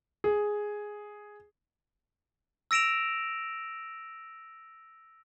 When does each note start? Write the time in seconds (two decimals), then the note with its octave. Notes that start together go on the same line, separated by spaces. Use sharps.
0.24 G#4
2.71 E6 A#6 D7 E7 F7